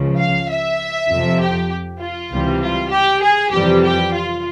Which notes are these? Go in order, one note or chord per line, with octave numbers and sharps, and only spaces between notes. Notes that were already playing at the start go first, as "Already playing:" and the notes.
Already playing: C#2 C#3 F3
F5
E5
F2 C3 F3
G4
F4
C#2 C3 E3 G3
F4
G4
G#4
F2 C3 E3 G3 G4
G4
F4